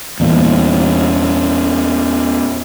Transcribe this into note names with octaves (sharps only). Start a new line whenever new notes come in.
E2 A#2